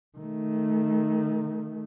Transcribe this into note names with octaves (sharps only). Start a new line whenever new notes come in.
D#3 A3